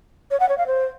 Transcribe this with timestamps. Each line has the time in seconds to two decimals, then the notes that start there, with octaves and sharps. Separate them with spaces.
0.31 C#5
0.40 F#5
0.49 C#5
0.58 F5
0.67 C5